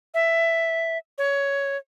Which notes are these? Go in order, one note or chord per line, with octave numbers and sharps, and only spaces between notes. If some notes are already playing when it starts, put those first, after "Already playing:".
E5
C#5